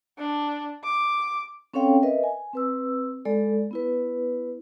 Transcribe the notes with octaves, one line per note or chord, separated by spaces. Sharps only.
D4
D6
C4 C#4 A4 C#5 F5 G5
A#4 B4 D#5 E5
G#5
C4 B4 E6
G#3 A4 D5
B3 E4 B4